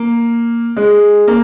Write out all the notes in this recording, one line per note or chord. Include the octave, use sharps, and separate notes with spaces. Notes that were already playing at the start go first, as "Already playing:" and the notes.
Already playing: A#3
G#3
A#3